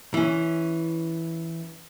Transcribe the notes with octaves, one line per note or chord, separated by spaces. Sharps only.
E3 C#4